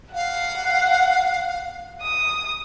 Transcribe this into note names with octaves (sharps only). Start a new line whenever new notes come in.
F5 F#5
D#6